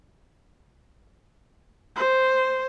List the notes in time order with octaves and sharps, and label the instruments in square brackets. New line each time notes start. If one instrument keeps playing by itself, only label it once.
[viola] C5